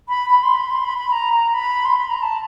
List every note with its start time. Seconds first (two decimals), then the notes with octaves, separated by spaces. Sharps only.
0.09 B5
0.30 B5
0.43 C6
0.57 B5
0.70 C6
0.85 B5
0.98 B5
1.12 A#5
1.33 A#5
1.54 B5
1.85 C6
1.96 B5
2.08 A#5
2.22 A5